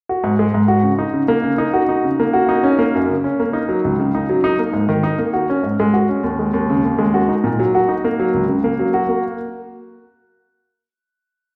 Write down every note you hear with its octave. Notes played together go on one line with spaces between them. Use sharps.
F#4
G#2
G#3
G#2
F#4
C#3
D#4
C#3
A#3
C#3
D#4
F#4
D#4
C#3
A#3
F#4
D#4
C#4
A#3
F#2
C#3
C#4
A#3
D#4
F#3
C#2
C#3
D#4
F#3
D#4
A#3
G#2
D#3
D#4
A#3
F#4
C#4
G#2
G#3
F#4
C#4
D#2
G#3
D#2
C#3
D#2
G#3
F#4
D#4
A#2
F#3
F#4
D#4
A#3
F#3
C#2
C#3
A#3
F#3
F#4
A#3